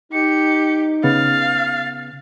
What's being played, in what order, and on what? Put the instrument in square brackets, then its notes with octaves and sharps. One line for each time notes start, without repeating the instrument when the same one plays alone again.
[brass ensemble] D#4 [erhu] G4 [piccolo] C#7
[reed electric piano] C#3 B3 [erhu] F5 [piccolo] A6